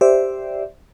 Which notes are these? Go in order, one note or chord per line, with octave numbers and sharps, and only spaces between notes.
G4 C5 D5 E5